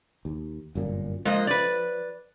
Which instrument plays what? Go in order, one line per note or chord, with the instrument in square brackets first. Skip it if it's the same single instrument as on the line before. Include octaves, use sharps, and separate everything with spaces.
[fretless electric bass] D#2
G1 F#2 A#2
[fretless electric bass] F3 [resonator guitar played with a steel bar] G#3 A#3 D#5
[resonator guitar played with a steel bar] B4 D5